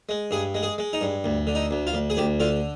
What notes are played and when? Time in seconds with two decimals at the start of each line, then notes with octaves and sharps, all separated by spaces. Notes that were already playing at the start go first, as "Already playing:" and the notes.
0.09 G#3
0.31 G2 G#4
0.55 G#3
0.63 G#4
0.78 G#3
0.93 D#4
1.01 G2
1.24 D2
1.47 D3
1.55 D#4
1.71 D2
1.87 F4
1.93 D2
2.10 G#4
2.17 D2 G4
2.40 D3 F4